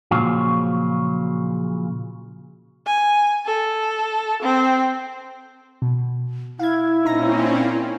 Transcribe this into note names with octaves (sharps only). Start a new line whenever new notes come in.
A#2 C#3 F3 F#3 F4
G#5
A4
C4
B2
E4 F5 G#6
A#2 C4 C#4 D#4 A#5 A#6